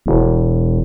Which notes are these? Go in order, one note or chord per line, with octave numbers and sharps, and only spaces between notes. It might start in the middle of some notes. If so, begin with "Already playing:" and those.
E1